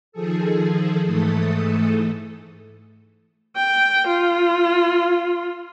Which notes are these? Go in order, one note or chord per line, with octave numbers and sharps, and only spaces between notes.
D#3 F3 G#4 A4
G#2 E3 A3 A4 D#6
G5
F4